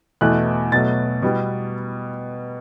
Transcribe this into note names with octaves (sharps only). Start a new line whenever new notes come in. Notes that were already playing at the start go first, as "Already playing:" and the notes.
E2 B2 A3 F#6
B2 F#3 A3 A6
B2 G3 B3